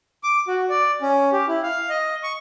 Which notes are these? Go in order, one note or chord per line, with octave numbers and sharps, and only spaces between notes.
D6
F#4
D5
C#4
G4
E4
F5
D#5
C#6